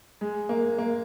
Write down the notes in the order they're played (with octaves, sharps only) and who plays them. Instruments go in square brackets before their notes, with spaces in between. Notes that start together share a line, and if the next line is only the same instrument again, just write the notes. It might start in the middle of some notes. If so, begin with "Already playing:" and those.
[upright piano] G#3
A#3
A#3